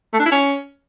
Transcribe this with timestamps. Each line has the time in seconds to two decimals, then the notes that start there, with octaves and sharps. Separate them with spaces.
0.14 A3
0.20 D4
0.26 E4
0.31 C#4